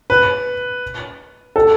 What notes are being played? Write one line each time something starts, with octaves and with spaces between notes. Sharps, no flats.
B4
A4